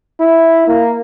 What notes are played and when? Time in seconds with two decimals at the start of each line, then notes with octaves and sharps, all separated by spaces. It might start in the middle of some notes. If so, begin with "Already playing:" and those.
0.20 E4
0.68 A#3